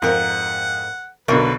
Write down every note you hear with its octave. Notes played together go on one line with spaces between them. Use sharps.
F2 G#2 A#4 F#5
B1 B2 D3 A#4 B4